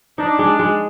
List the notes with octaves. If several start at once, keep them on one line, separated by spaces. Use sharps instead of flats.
D4 D#4
G#3
G#3